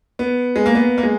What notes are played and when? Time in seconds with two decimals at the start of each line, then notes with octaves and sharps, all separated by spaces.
0.19 B3
0.56 G#3
0.66 A#3
0.75 B3
0.98 A#3
1.03 G#3